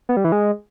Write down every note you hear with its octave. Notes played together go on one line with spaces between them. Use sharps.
B3
G3
E3
G#3